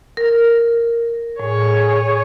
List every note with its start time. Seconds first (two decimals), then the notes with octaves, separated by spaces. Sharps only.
0.17 A#4
1.40 A2 G#4 C#5